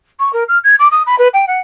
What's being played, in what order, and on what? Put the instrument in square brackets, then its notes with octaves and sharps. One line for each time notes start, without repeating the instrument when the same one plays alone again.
[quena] C#6
A#4
F6
G#6
D6
D#6
B5
B4
G5
F#5